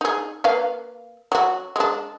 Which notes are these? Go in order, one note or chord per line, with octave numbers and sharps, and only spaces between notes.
D#4 G#4
A#3 B4 F5
F#3 F#4
G#3 D4